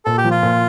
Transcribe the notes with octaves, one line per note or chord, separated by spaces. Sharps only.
A#2 A4
G4
F3
F4
A#2